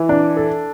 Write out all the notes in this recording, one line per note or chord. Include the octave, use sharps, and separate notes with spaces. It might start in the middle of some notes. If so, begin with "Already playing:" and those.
Already playing: E3
D4
A4